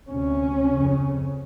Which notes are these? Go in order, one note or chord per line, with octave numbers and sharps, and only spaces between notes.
D2 C3 C#4
F2 C#3